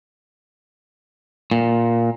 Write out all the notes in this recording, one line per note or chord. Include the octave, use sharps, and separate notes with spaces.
A#2